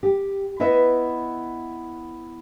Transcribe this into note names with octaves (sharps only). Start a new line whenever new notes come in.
G4
B3 E4 B4 D#5 E5